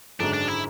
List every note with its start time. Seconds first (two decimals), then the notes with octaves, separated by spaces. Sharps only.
0.20 G#1 F#2 D3 G#3 D4
0.33 D4
0.48 E4